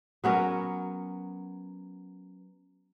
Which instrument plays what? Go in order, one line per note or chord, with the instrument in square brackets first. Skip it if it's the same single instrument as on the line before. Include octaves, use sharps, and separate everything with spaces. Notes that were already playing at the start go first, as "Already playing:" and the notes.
[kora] F#3 B3 C#4 A#4